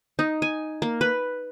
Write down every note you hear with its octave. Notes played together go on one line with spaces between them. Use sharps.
D#4
G#5
A#3
B4